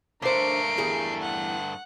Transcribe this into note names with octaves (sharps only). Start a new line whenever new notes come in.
G2 A3 D4 A#4 C5 C7 D7
E2 G3 G#4
F#5